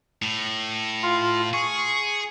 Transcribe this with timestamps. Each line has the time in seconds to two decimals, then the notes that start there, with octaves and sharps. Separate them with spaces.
0.22 A2
1.03 F4
1.53 G#4 C#6